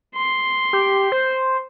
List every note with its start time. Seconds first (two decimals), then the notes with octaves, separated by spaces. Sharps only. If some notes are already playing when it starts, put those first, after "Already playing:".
0.16 C6
0.73 G4
1.12 C5